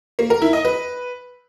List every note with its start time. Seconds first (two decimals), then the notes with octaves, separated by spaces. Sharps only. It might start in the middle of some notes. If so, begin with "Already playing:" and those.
0.19 A#3
0.30 A#4
0.42 E4
0.53 D#5
0.65 B4